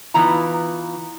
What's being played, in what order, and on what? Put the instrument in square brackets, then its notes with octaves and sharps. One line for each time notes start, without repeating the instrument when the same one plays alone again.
[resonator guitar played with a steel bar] E3 B3 D#4 F4 A#5